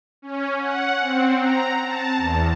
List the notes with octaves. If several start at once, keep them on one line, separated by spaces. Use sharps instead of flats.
C#4
F#5
C4
A#5
A5
E2